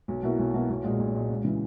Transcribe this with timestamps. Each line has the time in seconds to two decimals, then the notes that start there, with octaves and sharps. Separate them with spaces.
0.08 B1
0.23 B2 A#3 E4
0.39 B1
0.54 B2 A#3 E4
0.69 B1
0.84 A#2 G#3
0.99 B1
1.15 A#2 G#3
1.30 C#2
1.45 C#3 E3